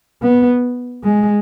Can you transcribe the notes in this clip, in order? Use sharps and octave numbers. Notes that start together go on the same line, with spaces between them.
B3
G#3